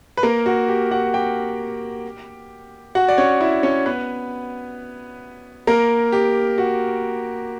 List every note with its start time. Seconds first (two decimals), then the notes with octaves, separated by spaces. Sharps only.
0.17 B4
0.23 A#3 A#4
0.46 F#4
0.68 G4
0.91 F#4 F#5
1.14 G4 G5
2.95 F#4 F#5
3.08 D5
3.18 C#4 C#5
3.41 E4 E5
3.63 C#4 C#5
3.86 B3 B4
5.67 A#3 A#4
6.12 G4
6.58 F#4